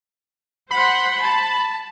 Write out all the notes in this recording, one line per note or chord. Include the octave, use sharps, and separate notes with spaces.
C5 F#5 B5 C6
A5